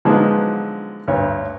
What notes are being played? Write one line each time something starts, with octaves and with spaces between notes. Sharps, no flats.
D3 F3 F#3 G#3 B3 D#4
D2 G2 C#5